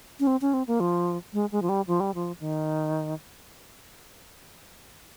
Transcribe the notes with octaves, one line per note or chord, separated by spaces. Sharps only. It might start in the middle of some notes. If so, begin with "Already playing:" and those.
C#4
C4
C#4
C4
A#3
F3
G#3
G#3
F3
G3
F3
G3
F3
D#3